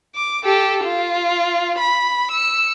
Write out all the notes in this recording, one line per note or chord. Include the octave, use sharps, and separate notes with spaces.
D6
G4 A4
F4
B5
E6 C#7